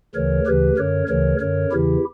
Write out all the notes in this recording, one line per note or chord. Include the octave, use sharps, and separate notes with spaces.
D2 C#3 E3 A#4 C#5
D2 C#3 E3 G4 B4
F#2 D3 A#4 C#5
D2 C#3 E3 A#4 C#5
F#2 D3 A#4 C#5
E2 C#3 E3 E4 G4